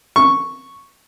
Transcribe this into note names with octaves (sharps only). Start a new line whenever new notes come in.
C#6